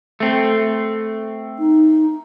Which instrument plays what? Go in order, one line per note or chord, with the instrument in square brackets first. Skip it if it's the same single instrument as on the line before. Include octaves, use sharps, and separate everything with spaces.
[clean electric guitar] A3 C4
[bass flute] D#4